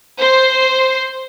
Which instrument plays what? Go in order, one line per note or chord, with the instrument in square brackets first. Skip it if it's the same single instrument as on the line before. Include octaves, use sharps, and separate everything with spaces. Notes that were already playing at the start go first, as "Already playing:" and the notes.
[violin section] C5